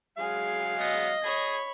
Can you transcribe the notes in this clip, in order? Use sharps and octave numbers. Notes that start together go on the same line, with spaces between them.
F#3 G#3 G#4 F5
B3 D#5
G#4 C#5 B5